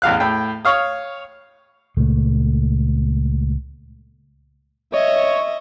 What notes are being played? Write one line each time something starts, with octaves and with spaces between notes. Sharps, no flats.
A1 E2 F5 F#6
A2 G5
C#5 F5 D#6
C#2 A#2 A3
C#5 D#5 E5